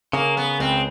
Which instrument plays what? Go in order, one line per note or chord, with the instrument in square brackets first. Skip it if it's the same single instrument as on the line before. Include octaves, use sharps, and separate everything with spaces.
[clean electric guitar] C#3 [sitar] A#3
[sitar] B3
[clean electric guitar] C#2 [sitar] C4